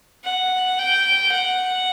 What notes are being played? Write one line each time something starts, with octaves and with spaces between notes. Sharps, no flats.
F#5
G5
F#5